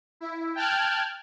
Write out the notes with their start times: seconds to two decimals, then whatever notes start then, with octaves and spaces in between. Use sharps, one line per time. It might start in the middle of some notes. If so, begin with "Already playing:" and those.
0.21 E4
0.55 G5 A5 F6 F#6 G#6